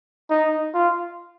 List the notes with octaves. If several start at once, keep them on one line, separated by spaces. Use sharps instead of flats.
D#4
F4